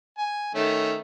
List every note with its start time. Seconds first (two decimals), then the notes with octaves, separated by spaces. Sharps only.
0.18 G#5
0.55 D#3 A3 C#4